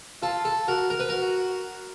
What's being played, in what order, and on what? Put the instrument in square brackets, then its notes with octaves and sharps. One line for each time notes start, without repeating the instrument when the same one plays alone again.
[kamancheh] F4 [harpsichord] A4
[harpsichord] A4
[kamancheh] F#4 [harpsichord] A#4
[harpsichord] A#4
B4
[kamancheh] F#4 [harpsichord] A#4